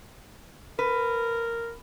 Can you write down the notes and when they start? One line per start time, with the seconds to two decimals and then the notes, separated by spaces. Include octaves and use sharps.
0.79 A#4 B4